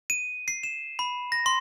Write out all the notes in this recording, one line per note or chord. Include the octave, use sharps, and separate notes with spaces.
D#7
C7
E7
B5
A#6
C6